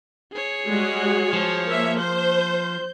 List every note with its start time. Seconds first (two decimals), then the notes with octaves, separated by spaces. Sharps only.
0.32 G#4 C#5
0.65 G3 G#3 F#4
1.33 F3
1.66 A#3 E5
1.99 C5 G6